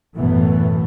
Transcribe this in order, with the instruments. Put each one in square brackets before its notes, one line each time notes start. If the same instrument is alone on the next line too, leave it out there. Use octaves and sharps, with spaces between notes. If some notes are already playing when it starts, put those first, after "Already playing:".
[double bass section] A1 F#2 B2 E3 A3 B3